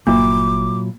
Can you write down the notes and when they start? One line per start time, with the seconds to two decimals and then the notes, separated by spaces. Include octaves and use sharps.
0.07 G1 A#2 F#3 A#3 E4 D6